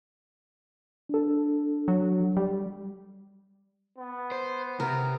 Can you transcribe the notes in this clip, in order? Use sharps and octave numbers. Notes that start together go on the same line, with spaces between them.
D4 A4
F#3
G3
B3
C5
C3 A#4